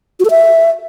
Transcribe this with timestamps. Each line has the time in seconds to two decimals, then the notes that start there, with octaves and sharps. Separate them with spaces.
0.20 F#4
0.25 A4
0.30 E5